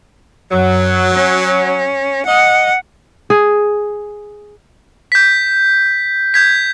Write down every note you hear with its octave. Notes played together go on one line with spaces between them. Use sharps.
F#2 F#3
C#4
D#5 F#5
G#4
G6 B6
G6 G#6 B6